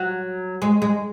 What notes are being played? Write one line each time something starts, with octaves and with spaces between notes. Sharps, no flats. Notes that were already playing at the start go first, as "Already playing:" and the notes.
Already playing: F#3
G#3
G#3